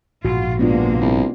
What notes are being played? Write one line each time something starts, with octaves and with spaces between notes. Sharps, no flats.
A#1 G#2 B2 F4 F#4
C3 G#3 A#3 B3 D4 F4
C2